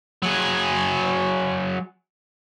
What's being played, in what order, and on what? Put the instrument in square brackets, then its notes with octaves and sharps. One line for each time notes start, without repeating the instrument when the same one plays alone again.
[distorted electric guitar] F#3 G#4